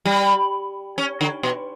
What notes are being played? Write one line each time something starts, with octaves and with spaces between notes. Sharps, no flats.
G3
C#4
D3
B2